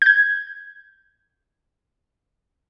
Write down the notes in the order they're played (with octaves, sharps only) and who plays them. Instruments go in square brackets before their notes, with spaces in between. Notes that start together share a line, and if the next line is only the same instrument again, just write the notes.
[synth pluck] G6 G#6